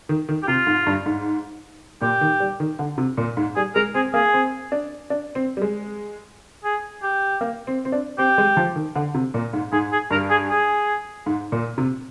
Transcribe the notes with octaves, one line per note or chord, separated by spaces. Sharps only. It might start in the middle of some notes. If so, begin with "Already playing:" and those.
D#3
D#3
G4
C3 F4
G#2
G2
G#2
A#2 G4
D#3
G3
D#3
D3
C3
A#2
G#2
G3 G#4
G#3 A#4
C4 G#4
A#3 G#4
C4
D4
D4
C4
G3
G#3
G#4
G4
A#3
C4
C4
D4
C4 G4
G#3
F3
D#3
D3
C3
A#2
G#2
G#2 G#4
G#4
G2 A#4
G#4
G#4
G#2
A#2
C3